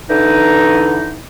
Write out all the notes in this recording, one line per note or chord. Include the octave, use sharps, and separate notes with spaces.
D3 E3 D#4